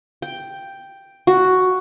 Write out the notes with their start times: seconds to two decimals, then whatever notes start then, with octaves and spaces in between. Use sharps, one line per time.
0.22 G5
1.27 F#4